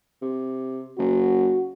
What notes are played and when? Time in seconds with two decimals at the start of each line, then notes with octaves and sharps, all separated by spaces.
0.22 C3
0.98 F#1 F#4